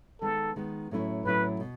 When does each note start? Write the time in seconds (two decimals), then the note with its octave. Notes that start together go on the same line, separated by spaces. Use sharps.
0.21 D#3 G#3 B3 A4
0.56 D#3 G#3 B3
0.91 A2 F#3 A3 C#4 E4
1.25 A2 F#3 A3 C#4 E4 B4
1.60 B2